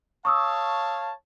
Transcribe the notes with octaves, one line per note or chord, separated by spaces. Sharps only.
C#5 F5 A5 C#6 D#6 E6